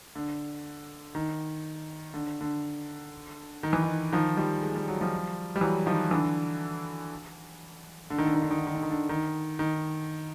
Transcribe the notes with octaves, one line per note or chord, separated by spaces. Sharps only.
D3
D#3
D3
D3
D#3
E3
D#3
D#3 F3
F3 G3
G#3
G3
F#3
F3 G3
G3
E3 F#3
D#3 F3
D3 E3
D3
D#3
D3
D#3
D3
D#3
D3
D#3
D3
D#3
D3
D#3
D#3